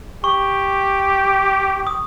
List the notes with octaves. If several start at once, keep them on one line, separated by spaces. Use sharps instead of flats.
G4 C#6
D#6